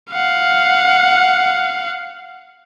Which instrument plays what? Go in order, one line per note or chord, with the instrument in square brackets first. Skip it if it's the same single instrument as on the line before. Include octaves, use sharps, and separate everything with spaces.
[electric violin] F5 F#5